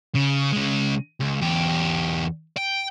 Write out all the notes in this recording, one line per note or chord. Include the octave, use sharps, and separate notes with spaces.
C#3
C#3 G#3
C#2
E2 G4
G5